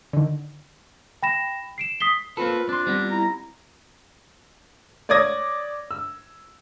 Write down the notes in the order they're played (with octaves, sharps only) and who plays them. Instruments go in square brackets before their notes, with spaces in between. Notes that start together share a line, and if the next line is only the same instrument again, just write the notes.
[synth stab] D3 D#3
[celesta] G5 B5 A#6 E7
C7 D7 E7
D#6 B6 C7 G7
[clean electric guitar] A#3 C4 A4 [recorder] F4 [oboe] B4
[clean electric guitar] C4 C6 [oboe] D4
[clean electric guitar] G3 B3 C4
[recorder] E4 [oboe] A#5
[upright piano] C#5 D5 D6 D#6 G#6 A#6
E6